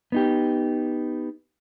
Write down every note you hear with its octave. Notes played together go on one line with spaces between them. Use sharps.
B3 D#4 G4